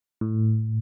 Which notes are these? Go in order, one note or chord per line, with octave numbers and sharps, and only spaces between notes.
A2